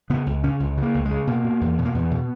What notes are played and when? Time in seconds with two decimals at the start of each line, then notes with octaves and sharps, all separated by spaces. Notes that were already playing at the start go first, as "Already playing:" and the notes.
0.10 C#3 B3
0.26 C#2
0.44 C#3 C#4
0.60 C#2
0.77 C#3
0.82 A#3
0.94 C#2
1.05 G#3
1.11 C#3
1.27 B2 A#3
1.44 B2
1.61 E2
1.79 B2
1.85 A#3
1.95 E2 B3
2.11 B2